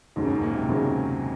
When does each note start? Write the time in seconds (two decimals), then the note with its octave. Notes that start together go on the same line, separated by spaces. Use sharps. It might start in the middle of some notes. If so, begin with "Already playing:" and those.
0.16 D#2 G#2 C#3 F#3 C#4
0.25 F#2
0.29 G#2
0.42 A#2
0.55 C3
0.68 D#2 C#3 F#3 C#4